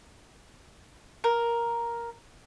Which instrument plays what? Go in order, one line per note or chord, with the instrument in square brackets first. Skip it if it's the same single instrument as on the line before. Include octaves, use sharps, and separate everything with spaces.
[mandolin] A#4